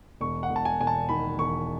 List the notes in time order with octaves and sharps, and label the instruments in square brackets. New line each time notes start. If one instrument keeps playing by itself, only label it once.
[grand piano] E1 C#6
F#5
E1
A5
G#5
E1 G#5
A5
D#3 B5
E1 C#6